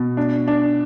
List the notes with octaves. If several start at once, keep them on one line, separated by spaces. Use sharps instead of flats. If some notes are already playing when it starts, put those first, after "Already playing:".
Already playing: B2
D4
D4